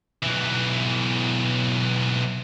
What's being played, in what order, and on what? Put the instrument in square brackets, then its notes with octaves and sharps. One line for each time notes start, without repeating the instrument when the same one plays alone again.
[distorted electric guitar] B1 E3